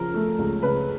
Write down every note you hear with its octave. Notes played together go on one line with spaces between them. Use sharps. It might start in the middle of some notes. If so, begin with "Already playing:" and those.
Already playing: C#3 F3 A#4
A3
C#2
C#3 B4